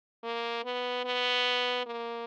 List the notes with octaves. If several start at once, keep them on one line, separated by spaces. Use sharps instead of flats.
A#3
B3
B3
A#3